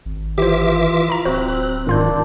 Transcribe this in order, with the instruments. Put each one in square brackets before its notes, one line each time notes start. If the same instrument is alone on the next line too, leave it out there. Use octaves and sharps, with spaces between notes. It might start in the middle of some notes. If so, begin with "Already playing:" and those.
[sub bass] G#1
[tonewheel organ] E3 E5 D6 [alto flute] F4 [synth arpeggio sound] G4 C5
[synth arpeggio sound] A#5 B5
[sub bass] D1 [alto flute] C4 [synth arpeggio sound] F#4 C5 [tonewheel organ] F#6
[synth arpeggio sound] G#2 F4 G6 [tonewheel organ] D#3 [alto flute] D4